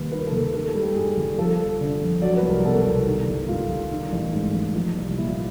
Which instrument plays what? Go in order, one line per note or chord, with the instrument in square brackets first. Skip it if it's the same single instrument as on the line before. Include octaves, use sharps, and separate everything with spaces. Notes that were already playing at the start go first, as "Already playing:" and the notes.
Already playing: [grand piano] D#2 G3 B4
D#3 B4
A#4
A4
D#2 A#4
D#3 A4
A4
G3
G4
G2 G#4
G1
F3 A4
F2
D3
F2
F#3 D5
B4
C2
A#4
B2 A4
C2
D#3
G1
G2 F4
G1
D#3
A1
G#2
A1
F3 D#4
C2
A#2 E4
F4